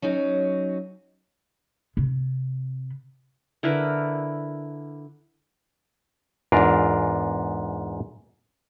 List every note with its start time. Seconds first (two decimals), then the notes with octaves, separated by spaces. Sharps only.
0.02 F#3 C#4 D#4 F#4
1.97 C3
3.63 D3 E4 A#4 B4
6.52 E2 G#2 D4 F4 A#4